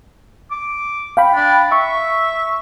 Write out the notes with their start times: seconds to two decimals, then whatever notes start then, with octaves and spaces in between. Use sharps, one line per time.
0.52 D6
1.17 F5 G5 B5
1.35 D4
1.72 E5 C#6